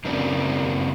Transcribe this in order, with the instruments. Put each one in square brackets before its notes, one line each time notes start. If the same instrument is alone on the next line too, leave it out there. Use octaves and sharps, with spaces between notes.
[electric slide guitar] F#2 C#3 A#3 C4 D4